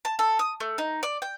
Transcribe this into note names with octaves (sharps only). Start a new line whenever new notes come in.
A5
A4
D#6
A3
D#4
D5
G5